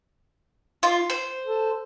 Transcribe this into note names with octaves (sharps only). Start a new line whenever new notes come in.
F4
C5
A4